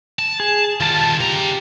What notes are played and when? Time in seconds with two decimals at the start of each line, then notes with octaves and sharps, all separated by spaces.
0.19 A5
0.40 G#4
0.80 D#3 G3 F4 A5
1.20 C#3 G4 A#5